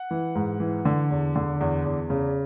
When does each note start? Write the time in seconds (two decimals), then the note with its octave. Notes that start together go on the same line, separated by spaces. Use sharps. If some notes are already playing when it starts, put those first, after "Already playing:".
Already playing: F#5
0.11 E3
0.35 G#2
0.60 E3
0.85 D3
1.10 E2
1.36 D3
1.61 E2
1.85 E2
2.10 C#3